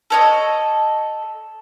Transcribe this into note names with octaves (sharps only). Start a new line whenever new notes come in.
A4 C#5 D#5